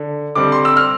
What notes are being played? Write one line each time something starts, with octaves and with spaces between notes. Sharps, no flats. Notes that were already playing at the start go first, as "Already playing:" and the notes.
Already playing: D3
D3 G3 C4 D6
C6
E6
F6